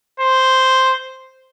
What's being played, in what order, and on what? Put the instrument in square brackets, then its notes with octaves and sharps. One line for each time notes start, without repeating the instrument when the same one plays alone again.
[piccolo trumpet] C5